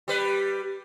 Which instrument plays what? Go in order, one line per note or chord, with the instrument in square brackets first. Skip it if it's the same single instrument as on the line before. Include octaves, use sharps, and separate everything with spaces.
[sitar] G3 B4